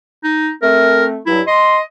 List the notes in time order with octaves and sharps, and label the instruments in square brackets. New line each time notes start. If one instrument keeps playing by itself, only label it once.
[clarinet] D#4
[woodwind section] A3 C4 [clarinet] A#4
[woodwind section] G2 F#3 [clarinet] E4
[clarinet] D#5 [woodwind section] C6